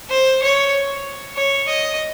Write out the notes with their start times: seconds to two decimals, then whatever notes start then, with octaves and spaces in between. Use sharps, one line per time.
0.11 C5
0.43 C#5
1.36 C#5
1.68 D#5